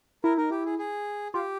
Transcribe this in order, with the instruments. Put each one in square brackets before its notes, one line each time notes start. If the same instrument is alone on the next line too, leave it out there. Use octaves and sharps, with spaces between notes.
[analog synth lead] E4 [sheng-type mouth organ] A#4
[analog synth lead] D#4 [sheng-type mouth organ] A#4
[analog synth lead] E4 [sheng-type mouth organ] G4
[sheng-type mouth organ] G#4
G#4
[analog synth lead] F4 [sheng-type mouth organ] G4